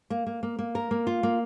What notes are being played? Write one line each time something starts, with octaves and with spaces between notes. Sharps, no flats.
A#3
A#3
A#3
A#3
A#4
A#3
F4
A#3